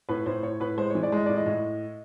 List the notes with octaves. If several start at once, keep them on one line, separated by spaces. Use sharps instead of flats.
A2 B4
A2 C5
A2 C#5
A2 B4
G#3 C5
E3 C#5
D5
G#3 D#5
A2 D5
D#5
A2